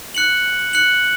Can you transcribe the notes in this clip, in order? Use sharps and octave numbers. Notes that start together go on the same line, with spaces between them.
F#6 C#7 F#7
F#6 C#7 F#7